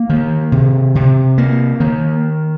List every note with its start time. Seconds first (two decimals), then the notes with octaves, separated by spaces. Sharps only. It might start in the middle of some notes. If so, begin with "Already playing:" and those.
Already playing: A#3
0.09 D#3
0.52 C3
0.95 C3
1.38 A#3
1.80 D#3